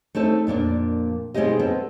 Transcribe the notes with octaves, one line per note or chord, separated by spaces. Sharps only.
A3 C4 D#4 A4
F2 A#2 A#3 D4
B2 G#3 C4 D#4 G4 D#5
B3 C4 A4